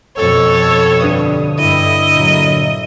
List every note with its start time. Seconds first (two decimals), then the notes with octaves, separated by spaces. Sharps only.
0.17 F2 B2 A4 C#5
1.00 G2 D3 D#6
1.59 G2 E4 D#5
2.12 A#2 F#3